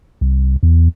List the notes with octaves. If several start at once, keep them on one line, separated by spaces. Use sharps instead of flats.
C2
E2